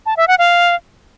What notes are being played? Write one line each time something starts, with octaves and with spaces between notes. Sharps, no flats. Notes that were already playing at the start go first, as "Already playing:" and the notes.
A5
E5
F#5
F5